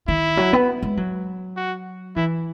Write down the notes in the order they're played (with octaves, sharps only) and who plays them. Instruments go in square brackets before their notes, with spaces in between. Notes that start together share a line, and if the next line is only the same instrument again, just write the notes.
[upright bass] D#3 [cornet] E4
[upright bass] F#3
B3
G#3
F#3
[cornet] F#4
[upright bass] E3 [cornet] E4